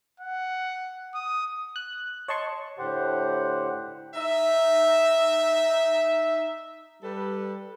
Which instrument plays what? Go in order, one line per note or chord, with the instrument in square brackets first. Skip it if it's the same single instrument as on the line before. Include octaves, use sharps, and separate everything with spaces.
[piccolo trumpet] F#5
D#6
[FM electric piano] F#6
C#5 D#5 A5 C6 C#6
[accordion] A2 D3 G4 C5 F#5
[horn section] D#4 E5
G3 A4 B4